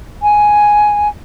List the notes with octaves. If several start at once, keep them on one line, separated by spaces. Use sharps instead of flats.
G#5